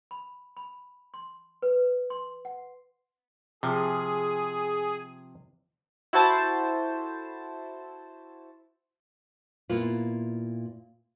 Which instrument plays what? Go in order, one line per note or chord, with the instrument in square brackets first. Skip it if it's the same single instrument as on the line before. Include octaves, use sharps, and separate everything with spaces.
[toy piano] B5
B5
C6
B4
C6
F#5
[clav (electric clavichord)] C3 F3 [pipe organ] G#4
[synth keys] E4 F#4 A4 C5 A5
[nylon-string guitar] A#2 B3 E4 F4